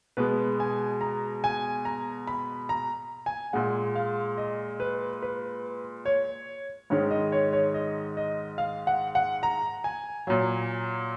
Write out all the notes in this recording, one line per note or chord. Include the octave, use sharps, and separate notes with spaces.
B2 G#3 B4
G#5
A#5
G#5
A#5
B5
A#5
G#5
A#2 G#3 F#5
F5
D#5
B4
B4
C#5
G#2 D#3 G#3 C#5
D#5
C#5
C#5
D#5
D#5
F5
F#5
F#5
A#5
G#5
A#2 F#3